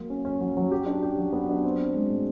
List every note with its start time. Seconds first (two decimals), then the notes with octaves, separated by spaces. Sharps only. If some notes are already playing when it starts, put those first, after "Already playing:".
Already playing: F#3 A#3
0.10 C#4
0.25 C#4
0.41 F#3
0.57 F#3
0.72 G4
0.86 D4
1.02 G4
1.18 F#3
1.33 B3
1.49 D4
1.63 C4
1.80 C4
1.95 G#3
2.10 A2